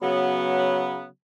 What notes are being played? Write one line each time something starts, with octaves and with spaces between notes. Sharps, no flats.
C#3 F#3 B3